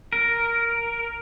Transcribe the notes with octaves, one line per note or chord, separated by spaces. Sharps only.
A#4